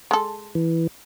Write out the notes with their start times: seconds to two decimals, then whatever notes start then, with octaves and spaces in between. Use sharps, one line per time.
0.11 G#3 A4
0.55 E3